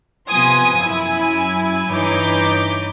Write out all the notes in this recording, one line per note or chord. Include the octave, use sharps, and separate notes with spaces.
C3 F3 B3 G#5 C6 D#6
F#2 E4 G#5
G2 E3 D#4 C#5 D6 G6